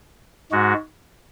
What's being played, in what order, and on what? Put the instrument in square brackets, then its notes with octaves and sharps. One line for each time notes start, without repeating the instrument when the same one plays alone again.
[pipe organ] G#2 G#3 F#4